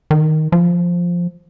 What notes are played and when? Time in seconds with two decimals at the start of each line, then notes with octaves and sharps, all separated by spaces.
0.11 D#3
0.52 F3